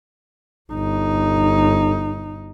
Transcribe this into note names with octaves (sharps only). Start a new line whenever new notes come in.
G1 D#4